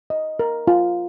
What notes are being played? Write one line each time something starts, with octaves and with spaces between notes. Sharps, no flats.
D#5
A#4
F4